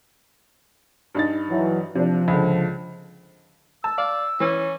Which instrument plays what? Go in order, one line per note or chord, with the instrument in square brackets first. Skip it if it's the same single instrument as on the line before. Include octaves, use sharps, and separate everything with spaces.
[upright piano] G2 D#4 A6
[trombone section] E3 F#3
[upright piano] C3 D4 [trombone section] F3
[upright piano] C#2 D3
[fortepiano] A5 [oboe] E6
[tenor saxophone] D5 [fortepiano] F5
[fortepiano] E3 [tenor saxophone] C#4